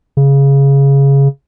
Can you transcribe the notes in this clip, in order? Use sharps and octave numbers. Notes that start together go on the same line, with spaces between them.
C#3